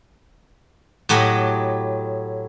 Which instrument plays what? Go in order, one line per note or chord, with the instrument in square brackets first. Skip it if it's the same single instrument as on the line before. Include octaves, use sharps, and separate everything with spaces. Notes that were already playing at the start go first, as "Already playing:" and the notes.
[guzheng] A2 F#3 G4 D#5 F#5